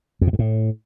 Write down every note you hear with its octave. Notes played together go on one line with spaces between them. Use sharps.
F2
B2
G2
A2